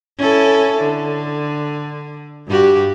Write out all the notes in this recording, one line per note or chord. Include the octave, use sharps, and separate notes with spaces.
C#4 E4 A4
D3
G2 F#4 G4